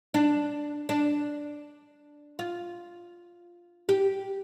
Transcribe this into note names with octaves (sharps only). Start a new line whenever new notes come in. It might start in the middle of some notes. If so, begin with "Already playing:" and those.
D4
D4
F4
G4